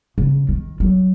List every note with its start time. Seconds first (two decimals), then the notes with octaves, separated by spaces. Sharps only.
0.18 C#3
0.49 D#3
0.80 F#3